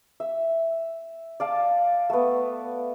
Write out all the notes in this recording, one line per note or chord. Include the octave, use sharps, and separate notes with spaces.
E5
D5 F5 A5
A3 B3